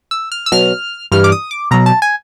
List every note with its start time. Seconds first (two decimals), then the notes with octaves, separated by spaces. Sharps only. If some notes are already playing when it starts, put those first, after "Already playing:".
0.11 E6
0.32 F6
0.46 E6
0.52 B2 F#3 F6
1.12 G2 E3 G3 F6
1.24 D6
1.32 D#6
1.51 D6
1.71 B2 F#3 A#5
1.86 A5
2.02 G#5